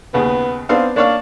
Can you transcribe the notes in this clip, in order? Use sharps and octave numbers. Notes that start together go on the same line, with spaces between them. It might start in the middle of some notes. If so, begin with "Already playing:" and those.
D#2 C#3 B3
B3 C4 D4 F5
A#3 D4 C#5 F5